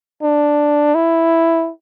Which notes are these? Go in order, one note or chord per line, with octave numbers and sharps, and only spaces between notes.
D4
E4